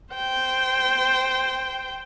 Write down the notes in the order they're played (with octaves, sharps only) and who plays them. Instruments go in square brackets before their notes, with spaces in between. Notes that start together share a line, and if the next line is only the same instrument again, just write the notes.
[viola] C5 G5